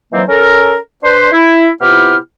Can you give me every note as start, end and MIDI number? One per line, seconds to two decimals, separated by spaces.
0.13 0.22 51
0.13 0.22 52
0.13 0.22 54
0.13 0.22 58
0.13 0.22 60
0.13 0.22 72
0.28 0.75 61
0.28 0.75 69
0.28 0.75 70
1.03 1.28 62
1.03 1.28 71
1.03 1.28 72
1.03 1.28 84
1.32 1.68 64
1.81 2.15 48
1.81 2.15 59
1.81 2.15 64
1.81 2.15 65
1.81 2.15 67
1.81 2.15 89